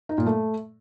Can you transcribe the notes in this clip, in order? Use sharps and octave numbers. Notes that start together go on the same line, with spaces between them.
D#4
A#2
A3